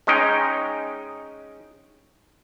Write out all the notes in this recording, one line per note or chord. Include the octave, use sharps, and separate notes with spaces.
G#3 C#4 D#4 G5